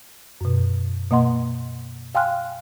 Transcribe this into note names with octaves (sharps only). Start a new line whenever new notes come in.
F#2 B2
B2 A#3 D#5 F#5 C6
F5 G5 G#5 C6 F6 F#6